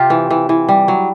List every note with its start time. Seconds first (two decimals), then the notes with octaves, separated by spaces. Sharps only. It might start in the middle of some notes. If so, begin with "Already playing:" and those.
Already playing: C3 F4 G4
0.10 E3
0.30 E3
0.49 E3
0.69 G3
0.88 F#3